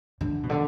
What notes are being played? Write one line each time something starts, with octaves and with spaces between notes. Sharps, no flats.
D3
B2
D3